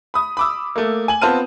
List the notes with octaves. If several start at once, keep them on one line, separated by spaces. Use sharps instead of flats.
B5 D#6
B5 D6 E6
A3 A#3
G#5 F#7
B3 C4 F4 A5 F6 D#7